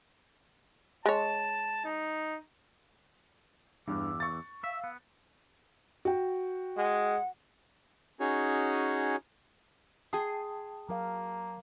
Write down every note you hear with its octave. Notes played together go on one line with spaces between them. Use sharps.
G#3 C#5 A5
D#4
E2 G2 D6 E6
C#6 A6
E5 F5 E6
B3
F#4 G5
G#3 F#5
C#4 D#4 F#4 G#4 C#5
G#4 G5 A5 C6 D#6
F#3 A#3 A#4 F5